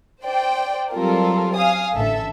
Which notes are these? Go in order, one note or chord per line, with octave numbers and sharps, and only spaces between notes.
C5 D5 G5
F#3 G3 C4 F4 A4 A#4
F5 G#5 D#6
A1 D3 A4 E5 A5